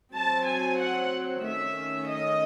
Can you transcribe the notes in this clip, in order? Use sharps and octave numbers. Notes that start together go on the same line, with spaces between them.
F#3 C4 A5
G#5
F#5
D#3 A3 C#4 E5
D#5